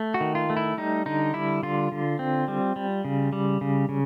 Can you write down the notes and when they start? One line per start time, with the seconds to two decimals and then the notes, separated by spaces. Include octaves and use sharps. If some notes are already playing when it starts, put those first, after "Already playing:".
Already playing: A3
0.14 F#4
0.21 D#3
0.35 F4
0.50 A3
0.57 E4
0.78 G3 D#4
1.06 D3 D#4
1.34 G3 E4
1.63 D3 F4
1.92 D3
2.19 C4
2.48 G3
2.76 G3
3.04 C#3
3.33 G3
3.61 C#3
3.89 C#3